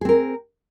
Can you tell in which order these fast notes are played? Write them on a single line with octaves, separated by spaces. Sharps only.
G#4 C4 A#4